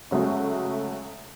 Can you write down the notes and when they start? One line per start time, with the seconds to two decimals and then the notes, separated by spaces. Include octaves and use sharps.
0.11 C#3 F#3 G#3 A3